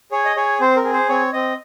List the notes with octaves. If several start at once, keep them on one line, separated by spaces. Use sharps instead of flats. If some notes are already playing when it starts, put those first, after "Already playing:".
G#4 C#5
D#5
G#4 C#5
C4 C5
A#4
G#4
C5
C4 C#5
C4 D#5